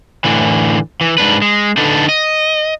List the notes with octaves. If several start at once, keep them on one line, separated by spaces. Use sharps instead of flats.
A2 D3 E3
E3
G#2 B2 D4 B4
G#3
D3 D4 D#4 A4 B4
D#5